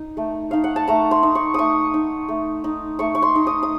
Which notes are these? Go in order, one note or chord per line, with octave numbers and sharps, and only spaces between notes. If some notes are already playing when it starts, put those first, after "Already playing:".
Already playing: D#4
A3
D#4 F5
F#5
A5
A3 A#5
C6
D#4
C#6
A3 C#6 D#6
D#4
A3
D#4
A3 C#6
C#6
C6
D#4
D#6
D#6